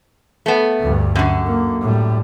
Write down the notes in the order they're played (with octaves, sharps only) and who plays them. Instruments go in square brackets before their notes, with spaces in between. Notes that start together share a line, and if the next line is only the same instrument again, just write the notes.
[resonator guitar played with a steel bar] A3 B3
[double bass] D2 G2
[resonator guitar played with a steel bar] F#2 D3
[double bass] A#3
A2 G3